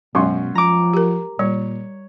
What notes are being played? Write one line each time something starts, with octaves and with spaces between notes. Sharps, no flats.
F#2 B2 F#3 G#3 C6 C#6
F3 A#5 D6
G4 A#4
A#2 G3 C#5